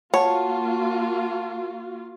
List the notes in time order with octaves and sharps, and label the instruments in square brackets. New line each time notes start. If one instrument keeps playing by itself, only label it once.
[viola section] A#3 F4 F#4 [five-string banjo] C#5 [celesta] F#5 A5